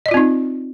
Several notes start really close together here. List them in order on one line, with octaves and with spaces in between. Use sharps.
D#5 D5 F4 C4 D#4